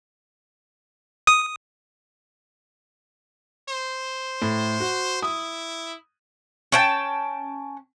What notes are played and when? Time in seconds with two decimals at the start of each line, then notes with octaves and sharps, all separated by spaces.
1.27 D#6
3.69 C5
4.42 A2
4.80 F#4
5.22 E4 D#6
6.72 C#4 G5 A5